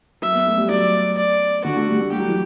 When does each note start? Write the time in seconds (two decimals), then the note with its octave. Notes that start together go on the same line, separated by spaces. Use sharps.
0.22 F#3 E5
0.34 B3
0.46 A3
0.57 G3
0.69 F#3 D5
1.17 D5
1.65 D3 F#4
1.77 A3
1.89 G3
2.00 A3
2.12 G3 G4
2.20 F#3
2.28 E3